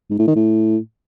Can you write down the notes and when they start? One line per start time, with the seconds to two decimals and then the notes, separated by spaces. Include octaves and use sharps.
0.10 G#2
0.19 A2
0.27 D#3
0.36 A2